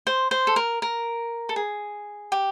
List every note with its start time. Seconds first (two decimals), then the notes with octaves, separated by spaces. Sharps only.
0.07 C5
0.31 C5
0.47 A4
0.56 A#4
0.82 A#4
1.49 A4
1.56 G#4
2.32 G4